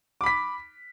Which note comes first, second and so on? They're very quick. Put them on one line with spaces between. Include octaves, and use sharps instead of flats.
D6 B5 B6